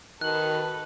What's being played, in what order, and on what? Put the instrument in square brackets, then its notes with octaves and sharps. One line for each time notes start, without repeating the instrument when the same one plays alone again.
[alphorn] D#3 [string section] F#4 A4 B4 [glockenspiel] F#6 F#7